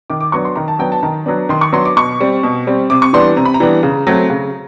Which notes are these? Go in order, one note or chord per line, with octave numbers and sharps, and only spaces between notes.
D#3 D6
D6
F#3 B3 D4 C#6
C6
D#3 A#5
A5
F#3 B3 D4 G5
A5
D#3 A#5
F#3 B3 D4
D#3 C6
C#6
F#3 B3 D4 C6
D6
B2 C#6
G3 C4
B2
G3 C4
C3 D6
C#6
E3 G3 B3 D4 C6
C3 A#5
B5
A#5
E3 G3 B3 D4
C#3
F#3 A3 C4
C#3